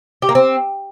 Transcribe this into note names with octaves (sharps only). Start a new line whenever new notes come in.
G4
A#3
C4